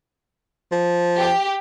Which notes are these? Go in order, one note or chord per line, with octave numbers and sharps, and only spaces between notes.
F3
G4